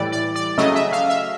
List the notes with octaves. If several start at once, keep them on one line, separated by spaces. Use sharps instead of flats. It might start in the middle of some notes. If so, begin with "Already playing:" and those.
Already playing: A2 E3 G3 D5
D5
D5
C#3 F#3 A3 D#5
E5
F5
E5